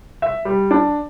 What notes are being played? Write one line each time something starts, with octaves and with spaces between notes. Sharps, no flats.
E5
G3
D4